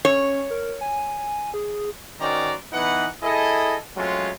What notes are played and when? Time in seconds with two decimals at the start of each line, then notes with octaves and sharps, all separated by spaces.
0.05 C#4 C#5
0.50 A#4
0.81 G#5
1.54 G#4
2.20 D#3 C#4 F#4 C5 D5 A#5
2.72 E3 B3 D#4 F#5
3.23 E4 G#4 A4 D#5
3.97 F#3 G#3 A3 C4 C#4 F4